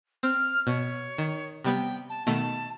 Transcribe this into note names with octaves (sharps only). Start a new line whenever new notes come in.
C4 F6
B2 C#5
D#3
C3 G3 B3 G5
A5
B2 D#3 A3 A5